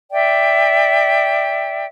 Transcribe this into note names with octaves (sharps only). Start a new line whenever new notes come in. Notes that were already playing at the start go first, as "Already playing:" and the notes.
D5 E5 G5